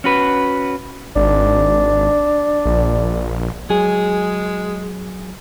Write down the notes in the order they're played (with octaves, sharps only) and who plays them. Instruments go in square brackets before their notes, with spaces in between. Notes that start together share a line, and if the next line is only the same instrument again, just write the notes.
[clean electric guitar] C#4 F#4 B4
[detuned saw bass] G#1 [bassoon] D4
[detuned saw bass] A#1
[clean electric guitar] F#3 G#4 [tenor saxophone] G#3